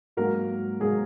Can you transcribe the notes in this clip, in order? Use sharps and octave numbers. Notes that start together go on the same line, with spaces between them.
G#2 F#3 A#3 F#4 A#4
G#2 F#3 A#3 G#4